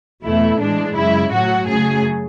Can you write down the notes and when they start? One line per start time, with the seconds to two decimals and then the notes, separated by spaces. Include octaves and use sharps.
0.24 E2 B2 A3 E4
0.60 A2 E3 G#3 D4
0.96 F#2 C#3 G#3 E4
1.31 A2 F#3 A3 F#4
1.66 F#2 C#3 F#3 A3 G#4